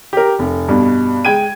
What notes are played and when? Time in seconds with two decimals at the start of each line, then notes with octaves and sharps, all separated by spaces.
0.13 G4 A#4
0.39 F1
0.68 G2 B2
1.25 G#3 G5 G#6 D#7